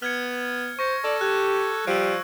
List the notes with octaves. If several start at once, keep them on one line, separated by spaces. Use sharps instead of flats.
B3 F6 G#6 C#7
C5 C#6 A#6 C#7
A4 D5
G4 F#6 G#6
F3 G3 E6 D7